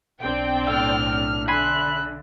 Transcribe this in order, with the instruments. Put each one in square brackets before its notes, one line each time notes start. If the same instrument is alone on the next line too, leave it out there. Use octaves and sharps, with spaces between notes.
[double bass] B1 D4 [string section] C4 D5 G5
[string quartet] A2 F6 [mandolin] A4
[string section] D3 [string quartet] E5 F#6 [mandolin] G#5 B5 C6